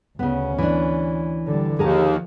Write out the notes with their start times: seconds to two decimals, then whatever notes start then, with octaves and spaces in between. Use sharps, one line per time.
0.19 D2 C#3 B3 C#4
0.58 E3 D4
1.47 D3 G3
1.79 D#2 F3 G#4 A#4 A5